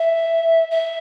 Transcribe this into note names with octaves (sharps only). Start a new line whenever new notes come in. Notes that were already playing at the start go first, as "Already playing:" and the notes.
Already playing: E5
E5